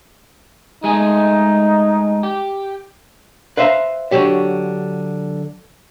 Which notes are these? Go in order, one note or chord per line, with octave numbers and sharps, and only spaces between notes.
G#3 A3 D#4 G#4
G4
B4 C5 E5 F5 A#5
D3 F#3 G4 C#5